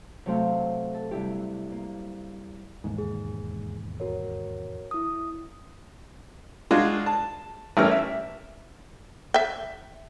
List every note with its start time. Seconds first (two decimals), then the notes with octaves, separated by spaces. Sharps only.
0.26 C3 F#3 A3 C4 C5 F5
0.94 A4
1.11 G2 C3 E4 G4
1.72 A#3
2.84 E1 D#2 G#2
2.98 G#4
4.00 F#4 A#4 C#5
4.91 E4 D#6
6.71 G#3 D4 F4 F#4
7.06 A5
7.77 A1 G2 A3 C#4 A#4 F6
7.91 E5
9.34 E5 G5